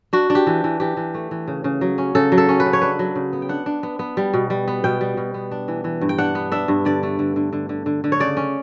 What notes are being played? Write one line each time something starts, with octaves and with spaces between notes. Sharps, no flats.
D4 F#4
D4
G4
E3
E3
E3 G4
E3
A3
E3
C#3
C#3
F#3
C#4
C#3 A4
F#3
A4
C#4
B4
C#3
C#5
D4 B4
F#3
C#3
B3
G5
D4 F#5
D4
B3
B3
G3
B2
G3
B3
B2 G5
G3
B2
B3
D4
E3
E3
G2
G5
D4 F#5
B3
D4 E5
G2
D3 D5
A3
D3
D3
D3
D3
D3
D3
C#5
C#3 D5
C#4